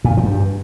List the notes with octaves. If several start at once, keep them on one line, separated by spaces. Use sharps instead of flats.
A#2
G2
F3
G2